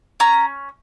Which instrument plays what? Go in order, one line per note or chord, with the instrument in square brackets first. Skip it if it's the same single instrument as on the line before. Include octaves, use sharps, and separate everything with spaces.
[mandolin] C#4 A#5